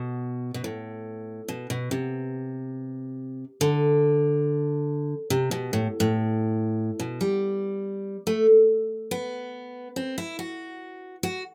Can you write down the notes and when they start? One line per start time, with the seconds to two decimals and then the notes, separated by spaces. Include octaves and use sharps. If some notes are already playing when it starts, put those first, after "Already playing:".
Already playing: B2
0.54 B2
0.64 A2
1.48 B2
1.70 B2
1.91 C3
3.61 D3
5.30 C3
5.51 B2
5.73 A2
6.00 A2
7.00 B2
7.21 G3
8.27 A3
9.11 B3
9.96 C4
10.18 E4
10.39 F#4
11.23 F#4